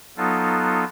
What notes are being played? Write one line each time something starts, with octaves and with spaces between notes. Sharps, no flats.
F#3 B3 D#4 F4 A4